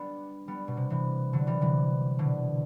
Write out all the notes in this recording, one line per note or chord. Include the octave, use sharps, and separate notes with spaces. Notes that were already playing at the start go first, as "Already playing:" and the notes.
Already playing: G3 B3 D4
G3 B3
B2
C3
C3 E3
D3 F#3
E3 G3
C3 E3
B2 D3